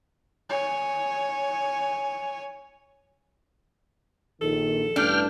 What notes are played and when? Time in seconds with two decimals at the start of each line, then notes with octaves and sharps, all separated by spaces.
0.49 C#5 G#5
4.41 A#1 D#3 A4
4.96 A1 G2 D4 G5 F6